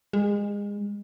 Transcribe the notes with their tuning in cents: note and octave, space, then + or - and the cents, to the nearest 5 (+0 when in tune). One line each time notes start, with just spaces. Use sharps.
G#3 -30